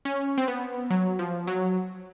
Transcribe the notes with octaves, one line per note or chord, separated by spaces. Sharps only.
C#4
C4
B3
F#3
F3
F#3